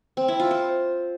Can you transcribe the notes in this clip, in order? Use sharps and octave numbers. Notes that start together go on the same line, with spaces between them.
C4
E4
F4
C5